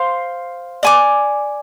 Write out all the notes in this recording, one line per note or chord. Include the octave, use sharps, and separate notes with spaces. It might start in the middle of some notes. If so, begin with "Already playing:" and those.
Already playing: C5 F5 C6
D5 G#5 D6